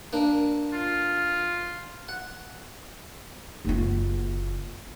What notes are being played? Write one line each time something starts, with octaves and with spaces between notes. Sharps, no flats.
A#3 D4
F4
F#5
F#1 F4